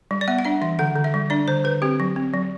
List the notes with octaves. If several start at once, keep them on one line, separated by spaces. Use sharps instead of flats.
G3
D5
B3 E5
F#5
D4 E5
E3 E5
D3 F#5
D3
E5
G3
D4 D5
D3 C5
D3 B4
C4 G4
F#3
C4
F#3